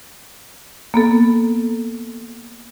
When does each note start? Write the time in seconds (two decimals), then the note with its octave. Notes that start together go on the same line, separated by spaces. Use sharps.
0.94 A#3 B3 A4